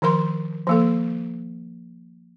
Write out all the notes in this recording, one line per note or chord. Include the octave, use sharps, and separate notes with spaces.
D#3 F3 A#4 C6
F3 A#3 A4